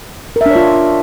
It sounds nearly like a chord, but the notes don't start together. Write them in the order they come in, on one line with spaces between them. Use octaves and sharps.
A#4 E5 D4 C#5 F4